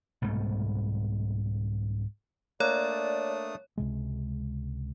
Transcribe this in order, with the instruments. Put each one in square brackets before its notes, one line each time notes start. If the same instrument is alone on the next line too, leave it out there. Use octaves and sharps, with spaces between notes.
[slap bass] C2 G#2 B2 A3
[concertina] A3 D4 D#6 [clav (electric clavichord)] A#3 [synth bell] C#5 [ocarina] D5
[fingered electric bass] C#2 C3 G#3